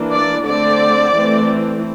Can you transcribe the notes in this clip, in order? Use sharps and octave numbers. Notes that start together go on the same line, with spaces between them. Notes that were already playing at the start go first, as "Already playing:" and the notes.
Already playing: E3 A#3 D4
D5
D3 A3 C4 D5
E3 A3 C4